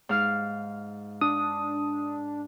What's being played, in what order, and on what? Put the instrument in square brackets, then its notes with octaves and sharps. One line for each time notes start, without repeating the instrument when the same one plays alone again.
[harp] G#2 F5 F6
[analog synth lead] D4 [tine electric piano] D#6